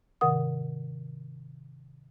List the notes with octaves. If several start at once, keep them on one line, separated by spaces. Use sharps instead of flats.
G#2 C3 D#3 A#4 F#5 D#6